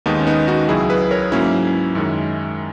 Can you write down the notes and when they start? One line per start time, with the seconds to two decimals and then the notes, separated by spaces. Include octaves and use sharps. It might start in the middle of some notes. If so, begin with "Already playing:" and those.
0.06 D#2 D#3 G#3 B3 D#4
0.20 C#4
0.27 B3 D#4
0.48 D#4 F#4
0.69 C#2 C#3 F#3 E4 G#4
0.90 G#4 B4
1.11 A#4 C#5
1.32 G#2 F#3 A#3 C#4 E4
1.95 F#2 D#3 G#3